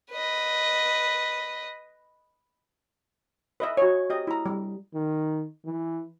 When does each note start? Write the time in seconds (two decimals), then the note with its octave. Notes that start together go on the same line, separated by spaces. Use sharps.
0.11 B4 D#5
3.60 B4 D#5 E5
3.77 F#4 C#5
4.10 G4 D#5
4.27 E4 A#5
4.46 G3
4.94 D#3
5.65 E3